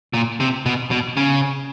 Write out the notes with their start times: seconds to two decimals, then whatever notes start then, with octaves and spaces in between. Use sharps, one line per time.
0.14 A#2
0.40 C3
0.66 B2
0.91 B2
1.17 C#3